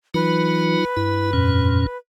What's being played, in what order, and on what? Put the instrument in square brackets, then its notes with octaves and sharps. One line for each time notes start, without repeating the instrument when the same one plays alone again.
[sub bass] E3 [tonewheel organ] F#3 D#4 F4 [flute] B4
[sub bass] G2 [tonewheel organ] E4
[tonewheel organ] F2 A#2 C#4